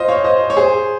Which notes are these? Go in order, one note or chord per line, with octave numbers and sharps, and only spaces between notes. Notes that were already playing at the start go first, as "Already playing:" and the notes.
Already playing: F4 C5 D#5
C#5 F5
C5 D#5
C#5
G#4 C5